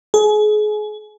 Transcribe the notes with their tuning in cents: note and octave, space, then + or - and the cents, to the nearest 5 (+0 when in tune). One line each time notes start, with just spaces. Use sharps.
G#4 +30